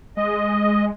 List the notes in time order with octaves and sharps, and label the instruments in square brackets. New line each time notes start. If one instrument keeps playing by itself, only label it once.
[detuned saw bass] G#3 [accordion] D#5